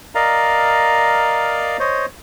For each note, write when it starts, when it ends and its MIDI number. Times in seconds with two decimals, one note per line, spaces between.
0.15 1.77 70
0.15 1.77 74
0.15 1.77 75
0.15 1.77 77
0.15 1.77 82
1.80 2.06 72
1.80 2.06 73
1.80 2.06 75